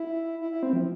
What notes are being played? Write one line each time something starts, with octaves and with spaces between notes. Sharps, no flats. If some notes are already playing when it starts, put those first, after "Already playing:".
Already playing: E4
E4
E4
C4
F3